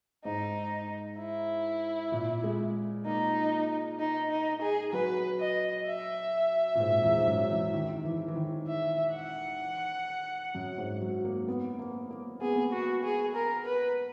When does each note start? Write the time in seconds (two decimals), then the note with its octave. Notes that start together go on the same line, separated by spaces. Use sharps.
0.25 G#2 D#4
1.19 E4
2.12 A#2
2.44 G#3
3.06 A#3 D#4
4.00 D#4
4.31 D#4
4.62 G#4
4.93 F#3 B4
5.40 D#5
5.87 E5
6.75 A#2
6.80 G#2
7.03 E2
7.18 G#2
7.26 F#2
7.50 E3
7.74 D#3
8.05 E3
8.28 E3
8.36 D#3
8.67 E5
9.14 F#5
10.54 F#2
10.78 G#2
11.01 F#3
11.25 A#3
11.48 B3
11.79 A#3
12.11 A#3
12.41 B3 G#4
12.56 B3
12.72 F#4
13.03 G#4
13.35 A#4
13.66 B4